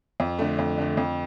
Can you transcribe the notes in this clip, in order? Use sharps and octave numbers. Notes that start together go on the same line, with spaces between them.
F2
D3 A3
F2
D3 A3
F2